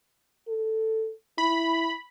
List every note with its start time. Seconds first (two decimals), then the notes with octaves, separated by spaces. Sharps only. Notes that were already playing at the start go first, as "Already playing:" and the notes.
0.48 A4
1.38 E4 B5